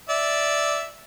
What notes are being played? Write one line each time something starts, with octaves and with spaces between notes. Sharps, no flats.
D5 E5